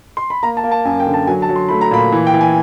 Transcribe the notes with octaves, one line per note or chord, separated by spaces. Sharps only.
C6
B5
A#3 A#5
A5
A#3
A5
F#2 G#5
G5
D3
A5
F#3 G#5
A5
F#3
C6
A3 B5
A#5
A#2 B5
E3
G5
E3
G#5